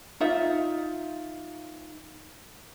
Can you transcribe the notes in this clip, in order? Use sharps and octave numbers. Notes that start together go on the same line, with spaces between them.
D#4 F4 E5